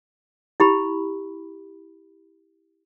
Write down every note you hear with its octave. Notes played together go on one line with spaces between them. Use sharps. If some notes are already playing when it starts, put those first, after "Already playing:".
E4 G4 B5